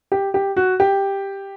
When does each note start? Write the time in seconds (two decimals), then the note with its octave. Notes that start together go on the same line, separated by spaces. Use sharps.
0.12 G4
0.34 G4
0.57 F#4
0.80 G4